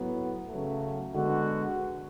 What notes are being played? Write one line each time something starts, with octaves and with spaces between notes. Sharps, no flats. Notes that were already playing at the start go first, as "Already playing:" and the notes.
Already playing: A2 F#3 B3
C#3 F#3 A3
D3 G#3 B3 F#4